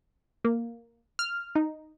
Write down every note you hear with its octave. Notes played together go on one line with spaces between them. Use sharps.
A#3
F6
D#4